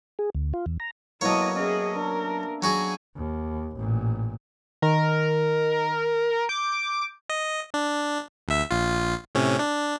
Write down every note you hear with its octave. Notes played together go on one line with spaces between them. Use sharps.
G#4
D2
F4
E2
A#5
F#3 A#3 B3 E4 A4 C#5 D#5
C#4 G#4 D#5 E5
D4 A#4
F#3 F#4 G#4 G#5
D#2
A1 A#2
D#3 A#4
D6 G6
D#5
D4
D2 E5
A#1 F4
A2 C3 C#4
D4